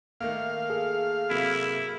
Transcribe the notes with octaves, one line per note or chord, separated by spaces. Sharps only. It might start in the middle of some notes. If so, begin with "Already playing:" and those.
D#3 A3 A#3 F5
G#4 A4
C3 F#3 A#3 E4